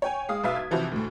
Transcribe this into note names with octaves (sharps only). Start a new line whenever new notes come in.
C#5 G5 G#5
G#3 F5 D#6
B1 B4 E5 F5 B6
G#6
C3 E3 F3 E4 F#4
D2 A2